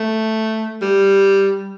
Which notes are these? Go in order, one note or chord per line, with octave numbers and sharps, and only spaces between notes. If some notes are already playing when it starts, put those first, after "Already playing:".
Already playing: A3
G3